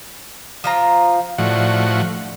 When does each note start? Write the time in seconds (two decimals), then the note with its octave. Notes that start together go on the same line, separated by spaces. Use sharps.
0.64 F3 F4 A#5
1.38 A2 D3 F3 F#4